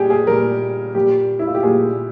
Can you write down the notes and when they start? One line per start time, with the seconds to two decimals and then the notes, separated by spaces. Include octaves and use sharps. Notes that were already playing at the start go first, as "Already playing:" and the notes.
Already playing: A#2 G3 G4 G#4
0.10 G#4
0.27 A#2 G3 A#4
0.95 A#2 G3 G4
1.39 E4
1.47 F4
1.55 G4
1.63 A#2 G3 G#4